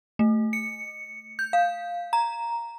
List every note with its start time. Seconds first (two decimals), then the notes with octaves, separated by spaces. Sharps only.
0.19 A3
0.53 C#7
1.39 G6
1.53 F5
2.13 A#5